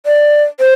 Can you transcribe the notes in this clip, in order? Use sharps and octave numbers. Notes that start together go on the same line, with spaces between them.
D5
C5